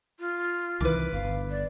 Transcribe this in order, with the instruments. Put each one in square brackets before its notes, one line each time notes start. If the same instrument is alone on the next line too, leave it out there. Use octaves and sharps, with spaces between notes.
[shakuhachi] F4
[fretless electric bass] C2 D#3 E3 [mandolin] B4 D6
[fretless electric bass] G1 [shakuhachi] F5
[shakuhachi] D5